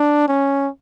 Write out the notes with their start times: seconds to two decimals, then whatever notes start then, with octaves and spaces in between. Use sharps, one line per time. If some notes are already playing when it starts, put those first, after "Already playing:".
Already playing: D4
0.28 C#4